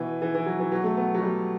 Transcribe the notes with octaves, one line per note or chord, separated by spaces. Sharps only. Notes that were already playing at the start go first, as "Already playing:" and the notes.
Already playing: B2 E3
E3
E3
F#3
E3
B2 F#3
A3
B3
F#3
G3